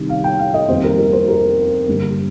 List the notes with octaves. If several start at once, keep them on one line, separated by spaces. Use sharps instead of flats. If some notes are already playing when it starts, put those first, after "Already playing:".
Already playing: C2 C3 D#3 G3
F5
G5
F5
D#5
F2 D#3 G3 A#3 C5
A#4
A#4
C5
A#4
G1 G2 G3 A#3